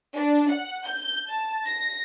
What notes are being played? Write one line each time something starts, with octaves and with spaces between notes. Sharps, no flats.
D4
F#5
G6
A5
A#6